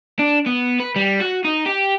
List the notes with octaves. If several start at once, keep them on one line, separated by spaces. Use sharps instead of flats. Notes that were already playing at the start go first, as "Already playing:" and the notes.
D4
B3
B4
G3
F#4
D#4
G4